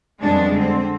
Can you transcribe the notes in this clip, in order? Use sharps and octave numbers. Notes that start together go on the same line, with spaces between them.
F2 B2 G3 G#3 D4
D3 C4